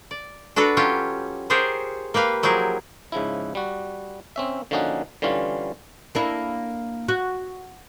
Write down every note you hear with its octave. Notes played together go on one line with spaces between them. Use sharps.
D5
D4 F#4 A4 B4 A#5
F#3 C#4 F4 G4
F4 G4 G#4 A#4 C5 C#5
A#3 G4 B4 F5
F3 F#3 E4 G4 G#4 A#4
G#2 C#3 F3 E4
G3 F#4
C4 C#4 E5
D3 F3 A#3 C#4 D#4 F#4
D3 E3 G3 C#4 F4
A#3 D4 E4
F#4